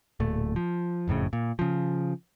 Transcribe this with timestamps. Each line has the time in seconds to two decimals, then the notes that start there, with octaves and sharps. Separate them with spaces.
0.20 D1 A#2 A3
0.56 F3
1.08 F#1 F2 A2 C#3
1.33 A#2
1.59 C#3 F3